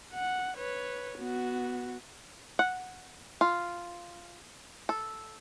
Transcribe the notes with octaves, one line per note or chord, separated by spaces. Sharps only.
F#5
B4 C#5
B3 F#4
F#5
F4
A4